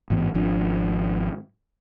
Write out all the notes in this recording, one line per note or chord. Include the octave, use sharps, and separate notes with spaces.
A1 G#2 E3 B3
G#1 F3 D4